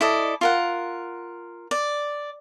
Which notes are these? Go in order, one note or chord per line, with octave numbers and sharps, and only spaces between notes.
E4 A4 D5 D#5
F4 A#4 F#5
D5